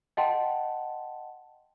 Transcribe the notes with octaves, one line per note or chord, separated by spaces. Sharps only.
D#5 F#5 G5 A5 C6